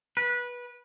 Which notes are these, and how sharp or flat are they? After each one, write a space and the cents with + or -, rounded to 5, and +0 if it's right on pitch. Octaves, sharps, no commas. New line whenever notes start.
B4 -20